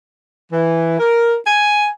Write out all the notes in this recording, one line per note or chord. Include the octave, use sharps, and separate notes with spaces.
E3
A#4
G#5